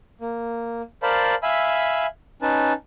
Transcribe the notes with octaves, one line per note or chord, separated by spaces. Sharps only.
A#3
A#4 C5 D5 F5 A5 B5
E5 F5 G#5 B5 E6
C#4 D#4 B4 A5